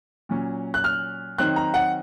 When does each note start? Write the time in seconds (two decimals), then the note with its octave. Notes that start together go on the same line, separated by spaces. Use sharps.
0.29 A#2 F#3 C#4
0.74 F#6
0.84 F6
1.38 D#3 F#3 C4 D#4 F#6
1.56 A#5
1.74 F#5